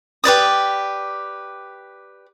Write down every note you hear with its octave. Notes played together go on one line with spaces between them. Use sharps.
G4 B4 D5 D#6